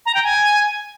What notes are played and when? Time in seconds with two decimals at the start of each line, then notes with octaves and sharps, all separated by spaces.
0.06 A#5
0.15 G5
0.24 G#5